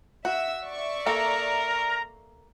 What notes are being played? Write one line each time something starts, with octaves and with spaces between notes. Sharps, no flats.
F#4 E5 E6
D5 E5 C#6
A#3 A4 A#4 A#5